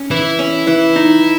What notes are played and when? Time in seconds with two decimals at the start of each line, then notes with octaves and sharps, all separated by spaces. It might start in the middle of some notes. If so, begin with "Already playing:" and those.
Already playing: C#4
0.11 E3 E4
0.39 C#4
0.67 E3
0.96 D#4